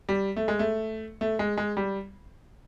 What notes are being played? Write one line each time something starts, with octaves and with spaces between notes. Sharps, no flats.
G3
A3
G#3
A3
A3
G#3
G#3
G3